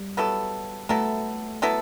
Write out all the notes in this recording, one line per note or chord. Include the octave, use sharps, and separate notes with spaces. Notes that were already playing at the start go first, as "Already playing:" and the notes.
Already playing: G3
F#3 B3 E4 A4
F#3 A3 B3 E4 A4
F#3 B3 E4 A4